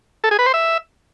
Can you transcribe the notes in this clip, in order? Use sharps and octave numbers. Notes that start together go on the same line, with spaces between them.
A4
G#4
B4
C5
E5